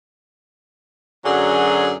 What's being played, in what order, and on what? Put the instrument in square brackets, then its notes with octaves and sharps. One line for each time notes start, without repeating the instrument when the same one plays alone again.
[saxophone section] F#2 D3 F#3 G#4